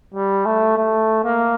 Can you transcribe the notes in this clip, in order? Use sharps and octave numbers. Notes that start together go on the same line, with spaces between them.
G3
A3
A3
A#3